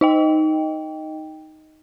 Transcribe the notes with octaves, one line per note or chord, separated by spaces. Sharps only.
D#4 D#5 G5